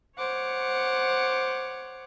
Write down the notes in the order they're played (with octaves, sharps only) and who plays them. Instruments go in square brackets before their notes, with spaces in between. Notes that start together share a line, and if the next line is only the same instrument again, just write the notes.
[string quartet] C5 C#5 F#5 D6